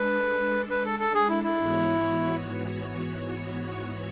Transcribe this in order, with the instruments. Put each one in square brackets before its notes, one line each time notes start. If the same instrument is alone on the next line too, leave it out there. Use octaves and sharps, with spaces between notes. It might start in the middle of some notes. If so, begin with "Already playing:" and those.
Already playing: [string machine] G#3 D4 A4 [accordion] B4
[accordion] B4
A4
A4
G#4
E4
E4
[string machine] G#2 E3 B3 F#4 C#5